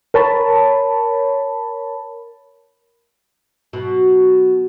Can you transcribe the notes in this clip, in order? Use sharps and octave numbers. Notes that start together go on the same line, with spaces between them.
A#4 C#5 A5 B5
B2 F#3